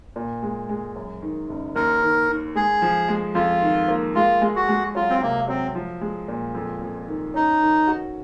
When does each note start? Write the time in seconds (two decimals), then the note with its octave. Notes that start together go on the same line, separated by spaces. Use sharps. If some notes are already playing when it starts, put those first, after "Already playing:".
0.16 A#2
0.43 G#3
0.69 G#3
0.96 F#2
1.22 D#3
1.49 F#1
1.76 D#2 A#4
2.02 D#3
2.29 D#3
2.55 G#3 G#4
2.82 F3
3.08 G#3
3.35 F2 F4
3.62 D#3
3.88 A#3
4.15 G#3 F4
4.42 G#3
4.56 F#4
4.68 G#3
4.95 F#3 F4
5.10 C4
5.22 C3 A#3
5.48 F#3 C4
5.75 F3
6.01 G#3
6.28 A#2
6.55 F2
6.81 F2
7.08 D#3
7.34 C#4 D#4
7.61 D#3
7.87 F#4